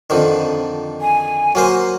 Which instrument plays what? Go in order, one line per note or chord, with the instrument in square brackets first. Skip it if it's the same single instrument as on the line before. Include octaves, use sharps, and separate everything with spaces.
[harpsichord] F2 D3 D#3
[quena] G#5
[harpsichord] F#3 A#3 C5